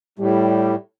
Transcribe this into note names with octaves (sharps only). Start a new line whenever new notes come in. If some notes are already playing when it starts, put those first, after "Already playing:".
A2 G3